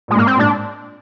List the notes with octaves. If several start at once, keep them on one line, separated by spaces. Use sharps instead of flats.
A#2 G#3
G#2
A#3
C4
A#2
G#2 D4